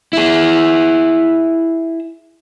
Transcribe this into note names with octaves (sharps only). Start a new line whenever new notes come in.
E4 G#4